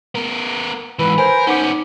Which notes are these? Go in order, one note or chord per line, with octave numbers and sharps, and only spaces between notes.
B3 A#4
G#2 E3 B4
A#4 C5 G#5
B3 C#4 D#4 F#5 D6